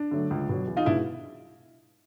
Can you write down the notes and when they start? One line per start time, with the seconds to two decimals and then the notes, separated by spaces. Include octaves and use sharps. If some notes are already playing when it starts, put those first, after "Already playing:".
Already playing: D4
0.11 D3 F#3 A3
0.31 C#2
0.49 B2 F#3
0.67 E2
0.77 D#4 F4
0.85 B2 G#3 D4 E4